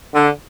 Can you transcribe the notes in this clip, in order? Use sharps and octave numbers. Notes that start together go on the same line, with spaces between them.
D3